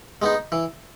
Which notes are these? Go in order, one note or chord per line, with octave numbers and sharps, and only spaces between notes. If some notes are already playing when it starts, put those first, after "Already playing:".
G#3 B3 D#4
E3